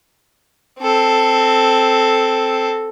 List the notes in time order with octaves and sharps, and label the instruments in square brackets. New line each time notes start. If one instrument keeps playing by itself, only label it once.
[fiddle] C4 A4